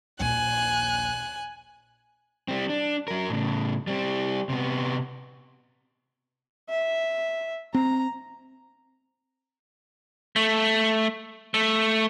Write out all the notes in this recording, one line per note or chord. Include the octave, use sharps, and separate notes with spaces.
A#1 D#2 G#5 F#6
G3 C4
D4
F#3 A#4
A2 C#3
G3 C4
C3 B3
E5
C4 A#5
A3
A3